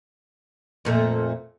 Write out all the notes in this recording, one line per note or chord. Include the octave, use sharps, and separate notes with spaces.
F2 A#2 A3